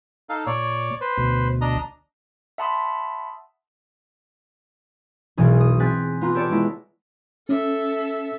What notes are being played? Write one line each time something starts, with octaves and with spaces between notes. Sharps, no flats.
D#4 A4 F5
A#2 C#5 D5
B4 C5
D2 B2
D4 D#5 A#5
E5 F#5 A5 B5 C6 D#6
E1 B1 G#4
D#6
C4 G#5 F#6 A6 B6
B3 F4 A#5 F#6
G4 A4 C#5 D5
G#3 B3 E4
C#4 A4 E5